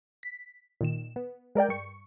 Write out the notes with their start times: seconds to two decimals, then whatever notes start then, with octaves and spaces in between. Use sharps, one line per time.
0.23 B6
0.81 A#2 D#3 E7
1.16 B3
1.55 G#3 A#4 D5 G5
1.68 G2 C#6